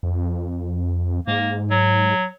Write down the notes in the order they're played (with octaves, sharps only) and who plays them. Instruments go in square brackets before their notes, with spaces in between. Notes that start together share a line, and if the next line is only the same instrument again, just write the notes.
[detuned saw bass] F2
[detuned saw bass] G#2 [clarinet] A#3
[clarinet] F#3